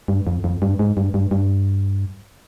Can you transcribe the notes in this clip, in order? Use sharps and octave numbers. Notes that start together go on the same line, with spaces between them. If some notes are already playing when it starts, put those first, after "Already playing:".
G2
F2
F2
G2
G#2
G2
G2
G2